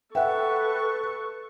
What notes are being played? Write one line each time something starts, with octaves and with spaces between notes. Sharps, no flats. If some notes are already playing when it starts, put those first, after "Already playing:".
A4 B4 E5 F#5 G5 C#6